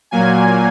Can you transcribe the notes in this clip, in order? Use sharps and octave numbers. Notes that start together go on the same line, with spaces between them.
A#2 F#3 A#3 G#5